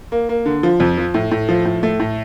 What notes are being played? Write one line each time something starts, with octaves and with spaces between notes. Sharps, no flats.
A#3
A#3
D3
F3
F2
F3
A2
A2
F3
A2
A3
A2